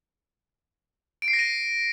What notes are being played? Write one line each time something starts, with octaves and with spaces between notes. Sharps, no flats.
D7
C7
A#6
D#7